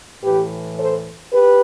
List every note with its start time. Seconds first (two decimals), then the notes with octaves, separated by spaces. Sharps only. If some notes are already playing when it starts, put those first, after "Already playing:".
0.24 A2 E3 G4 B4
0.78 A4 C5
1.33 G4 B4